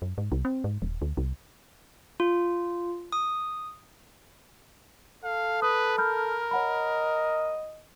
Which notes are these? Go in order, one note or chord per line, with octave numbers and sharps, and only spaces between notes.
F#2
G#2
C2
C4
G#2
D#1
D2
C2
F4
D#6
A4 F5
B4 D#6
A#4 B5 F6 G6
C#5 D#5 F#5 B5